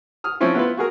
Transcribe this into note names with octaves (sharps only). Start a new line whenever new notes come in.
D#6 F6
F3 C4 C#4 E4 F4
B3 E4 F4 B4
F#4 G#4 A#4